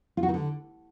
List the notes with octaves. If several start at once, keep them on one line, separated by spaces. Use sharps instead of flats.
F4
F#4
D#3
D3